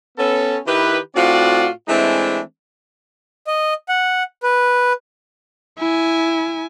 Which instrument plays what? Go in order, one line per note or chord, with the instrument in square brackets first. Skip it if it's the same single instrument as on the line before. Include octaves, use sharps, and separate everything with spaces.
[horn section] B3 C#4 A4
D#3 E4 G4 B4
A2 C4 F4 F#4 D5 F#5
E3 G#3 A3 C4 D4 E4
[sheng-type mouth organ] D#5
F#5
B4
[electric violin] E4 G#5